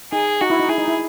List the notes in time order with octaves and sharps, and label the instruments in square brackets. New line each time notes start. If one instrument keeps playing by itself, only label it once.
[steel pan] D#4 [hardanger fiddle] G#4
[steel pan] D#4 [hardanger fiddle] F#4
[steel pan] E4
D#4
[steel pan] E4 [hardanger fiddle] G#4
[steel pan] D#4
E4